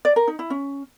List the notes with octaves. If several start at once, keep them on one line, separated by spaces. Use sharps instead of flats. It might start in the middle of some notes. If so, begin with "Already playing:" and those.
D5
A#4
D#4
E4
C#4